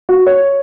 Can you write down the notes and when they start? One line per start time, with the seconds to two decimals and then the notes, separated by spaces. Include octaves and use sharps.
0.09 F#4
0.26 C#5